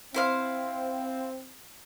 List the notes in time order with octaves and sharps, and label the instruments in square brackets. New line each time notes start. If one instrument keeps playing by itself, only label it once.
[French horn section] C4 [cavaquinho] E4 C5 F5